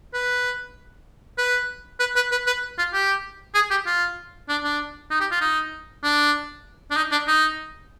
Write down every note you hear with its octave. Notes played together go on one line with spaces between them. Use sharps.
B4
B4
B4
B4
B4
B4
F4
G4
G#4
G4
F4
D4
D4
D#4
G4
F4
D#4
D4
D4
D#4
D4
D#4